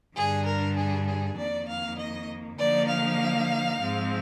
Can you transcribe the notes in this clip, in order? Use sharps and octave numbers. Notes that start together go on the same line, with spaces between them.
G2 D3 G3 D4 G#4
A#4
G#4
G#4
F2 D#3 A#3 D5
F5
D#5
D3 F3 A#3 D#4 D5
F5
G#2 F3 G#3 C4